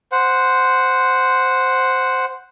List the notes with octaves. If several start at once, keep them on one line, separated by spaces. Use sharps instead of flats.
C5 F#5